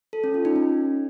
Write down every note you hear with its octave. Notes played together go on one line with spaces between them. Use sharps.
A4
C#4
F4
D#4
C#4